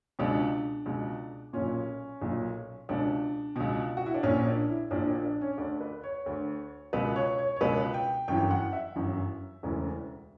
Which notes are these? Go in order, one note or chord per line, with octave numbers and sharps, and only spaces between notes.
C#2 B2 D4
C#2 B2
B1 A#2 C#4
B1 A#2
C#2 B2 D4
C#2 B2
F#4
E4
D4
A#1 A#2 C#4
D4
E4
A#1 A#2 D4
D4
D4
C#4
D2 D3 D4
B4
C#5
D2 D3
C#2 B2 B4
C#5
C#5
C#5
C#2 B2 B4
G5
G1 F#2 E3 G5
F#5
E5
G1 F#2 E3
E1 D2 C#3 E3